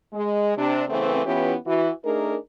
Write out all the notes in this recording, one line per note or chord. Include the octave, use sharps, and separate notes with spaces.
G#3
C3 D4
C#3 E3 A3 B3 C4
E3 B3 C#4 E4 F4 G4
E3 F#4
A3 D4 D#4 G#4 A#4